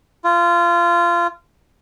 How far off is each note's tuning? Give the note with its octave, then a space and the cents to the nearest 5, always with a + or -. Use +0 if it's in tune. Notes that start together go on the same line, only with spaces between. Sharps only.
F4 -20